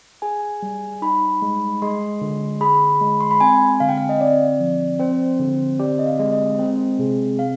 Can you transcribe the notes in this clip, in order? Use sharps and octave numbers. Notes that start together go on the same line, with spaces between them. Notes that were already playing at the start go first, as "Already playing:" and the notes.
G#4 G#5
G3
D#4 B5
G#3
G#3 C6
D3
G#4 B5
G#3
C6
B5
C4 G#5
D3 F5
G5
F5
D#5
C4 D5
F3
C4 C5
D3
G4 D5
D#5
F5
G#3
D#5
C4 C5
C3 G#4
C4 F5